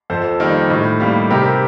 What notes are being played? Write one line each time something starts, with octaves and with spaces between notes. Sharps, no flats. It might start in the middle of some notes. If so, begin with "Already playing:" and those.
F2 A4 C5
D#3 G3 A#3 D#4
A2
G3 A#3 D#4
C3 G4 A#4